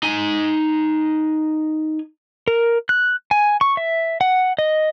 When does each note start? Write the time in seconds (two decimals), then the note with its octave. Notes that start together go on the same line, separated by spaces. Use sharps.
0.03 D#4 G#5
2.48 A#4
2.89 F#6
3.31 G#5
3.61 C#6
3.77 E5
4.21 F#5
4.59 D#5